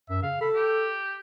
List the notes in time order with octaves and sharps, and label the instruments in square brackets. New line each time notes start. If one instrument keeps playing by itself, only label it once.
[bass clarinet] F#2 [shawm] E5
[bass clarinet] C#3 [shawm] F5
[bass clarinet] A4 [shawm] B5
[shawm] G4